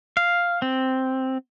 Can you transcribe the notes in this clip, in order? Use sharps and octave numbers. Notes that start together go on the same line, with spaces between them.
F5
C4